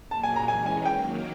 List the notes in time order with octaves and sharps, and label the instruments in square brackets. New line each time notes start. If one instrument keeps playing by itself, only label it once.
[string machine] A#2 F#3 A#3 [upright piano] A5
[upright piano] G#5
A#5
[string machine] E3 G#3 C#4 [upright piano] G#5
[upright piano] G#5
[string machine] D#3 F#3 A#3 [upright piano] G5